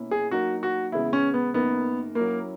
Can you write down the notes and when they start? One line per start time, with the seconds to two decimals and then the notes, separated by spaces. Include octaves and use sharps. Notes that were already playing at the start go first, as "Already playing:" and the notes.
Already playing: B2 A#3 C#4 E4
0.11 G#4
0.31 F#3 A#3 D#4 F#4 A#4
0.63 F#4
0.92 E2 C#3 G#3 B3 E4
1.13 C#4
1.34 B3
1.54 F#2 D#3 A#3 B3 D#4 A#4
2.15 F#3 A#3 C#4 E4 A#4